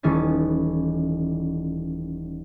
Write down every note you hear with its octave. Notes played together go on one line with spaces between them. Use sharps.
D#1 E3 A3 B3 C#4 A6